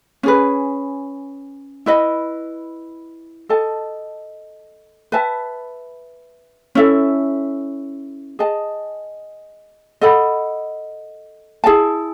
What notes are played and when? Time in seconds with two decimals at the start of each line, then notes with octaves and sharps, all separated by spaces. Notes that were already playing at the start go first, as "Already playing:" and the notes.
0.23 C#4 G#4 B4
1.86 E4 B4 D#5
3.49 A4 D#5 A5
5.12 B4 E5 A5
6.75 C#4 E4 A4 E5
8.39 G#4 D#5 A5
10.01 A4 D#5 F#5 B5
11.64 E4 G#4 D#5 A5